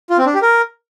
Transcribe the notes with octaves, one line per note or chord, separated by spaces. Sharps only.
F4
C4
D4
G4
A#4